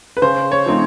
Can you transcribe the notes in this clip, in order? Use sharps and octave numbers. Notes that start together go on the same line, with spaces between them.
B4
C#3 C5
C#5
F3 A3 C4 D#4